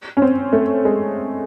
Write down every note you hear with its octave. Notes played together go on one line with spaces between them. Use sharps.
C#4
C4
A3
G#3